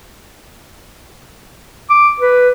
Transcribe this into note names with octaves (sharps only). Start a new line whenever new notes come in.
D6
B4